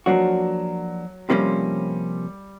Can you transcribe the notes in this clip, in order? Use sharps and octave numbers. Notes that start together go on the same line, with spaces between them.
F3 F#3 A#3 D4 F#4
F2 C3 F3 G3 A#3 C#4